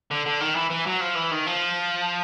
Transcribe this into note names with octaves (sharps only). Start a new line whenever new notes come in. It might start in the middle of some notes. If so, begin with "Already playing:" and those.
D3
D3
D#3
E3
E3
F#3
F3
E3
D#3
F3